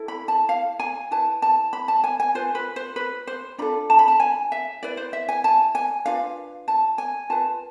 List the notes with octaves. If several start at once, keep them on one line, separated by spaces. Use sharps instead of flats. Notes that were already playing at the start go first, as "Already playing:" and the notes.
Already playing: E4 A4
B5
A5
F5
G#5
E4 B4 A5
A5
B5
A5
G#5
G#5
F4 B4 C5
B4
C5
B4
C5
D4 F4 A4 B5
A5
B5
A5
G#5
E5
E4 B4 D5
C5
E5
G#5
A5
G#5
D4 F4 B4 F5
A5
G#5
F4 B4 A5